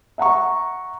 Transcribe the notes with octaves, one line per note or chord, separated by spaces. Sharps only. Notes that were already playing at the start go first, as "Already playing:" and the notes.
E5 F#5 A#5 C#6